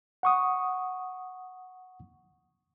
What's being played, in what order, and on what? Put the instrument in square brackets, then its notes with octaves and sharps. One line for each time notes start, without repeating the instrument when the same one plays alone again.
[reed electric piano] F#5 C#6 D#6